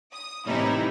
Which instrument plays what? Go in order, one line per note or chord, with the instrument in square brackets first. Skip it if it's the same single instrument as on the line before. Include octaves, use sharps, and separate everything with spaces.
[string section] D#6
A2 C3 E3 G3 D#4 E4